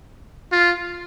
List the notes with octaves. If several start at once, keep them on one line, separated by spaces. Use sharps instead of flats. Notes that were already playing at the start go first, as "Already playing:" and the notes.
F4